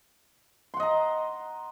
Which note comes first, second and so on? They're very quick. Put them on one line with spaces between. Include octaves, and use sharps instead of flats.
C6 F#5 D#5 A#5